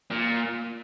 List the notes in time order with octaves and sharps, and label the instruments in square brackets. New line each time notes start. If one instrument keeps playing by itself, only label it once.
[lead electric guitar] A#2